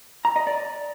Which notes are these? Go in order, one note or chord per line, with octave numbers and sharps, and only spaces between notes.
A#5
D#5
D5